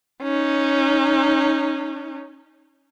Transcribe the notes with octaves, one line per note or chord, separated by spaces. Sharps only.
C#4 D#4